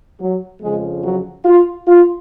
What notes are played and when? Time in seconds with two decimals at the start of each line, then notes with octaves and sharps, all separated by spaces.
0.21 F#3
0.62 F2 C#3 F3 G#3
1.04 F#3
1.45 F4
1.88 F4